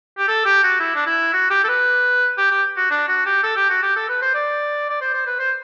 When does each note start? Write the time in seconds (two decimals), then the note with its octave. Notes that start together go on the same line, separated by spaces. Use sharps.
0.18 G4
0.28 A4
0.45 G4
0.63 F#4
0.80 E4
0.95 D4
1.06 E4
1.33 F#4
1.50 G4
1.64 A4
1.68 B4
2.37 G4
2.51 G4
2.77 F#4
2.90 D4
3.08 F#4
3.26 G4
3.43 A4
3.56 G4
3.69 F#4
3.82 G4
3.96 A4
4.08 B4
4.22 C5
4.34 D5
4.89 D5
5.01 C5
5.14 C5
5.26 B4
5.39 C5